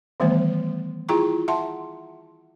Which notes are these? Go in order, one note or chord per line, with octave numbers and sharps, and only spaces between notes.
D#3 E3 G3 A3 B3 C5
E4 F4 G#4 G5 A#5 C#6
E5 F#5 A5 C6